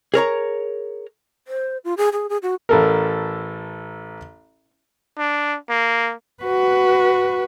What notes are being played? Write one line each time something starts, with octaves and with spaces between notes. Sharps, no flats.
G#4 A#4 C#5 A#5
C5
F4
G#4
G#4
G#4
F#4
A1 A4 A#4
D4
A#3
F#4 B4